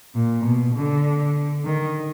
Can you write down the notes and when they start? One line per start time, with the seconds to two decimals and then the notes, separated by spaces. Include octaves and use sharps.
0.15 A#2
0.45 B2
0.75 D3
1.65 D#3